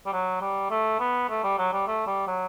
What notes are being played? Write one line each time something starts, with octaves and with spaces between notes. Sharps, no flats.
G3
F#3
G3
A3
B3
A3
G3
F#3
G3
A3
G3
F#3